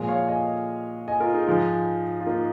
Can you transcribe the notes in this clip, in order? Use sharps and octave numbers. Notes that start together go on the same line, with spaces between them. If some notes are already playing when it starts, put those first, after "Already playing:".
Already playing: A#2 F3 G#3
C#5 F5
D#5 G#5
D#5 G#5
F4 A#4
D#4 G#4
G#2 F3 G#3
F4
A#3 D#4